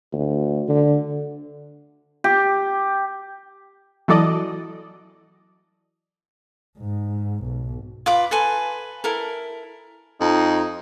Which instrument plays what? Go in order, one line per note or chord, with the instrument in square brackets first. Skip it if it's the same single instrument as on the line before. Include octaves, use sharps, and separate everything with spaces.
[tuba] D2
D3
[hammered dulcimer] G4
[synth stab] E3 F#3 A4 D5 D#5
[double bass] G#2
B1
[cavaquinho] F4 B4 D6
A4 B4 G#5 C6
E4 A4 A#4
[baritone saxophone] F2 [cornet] D#4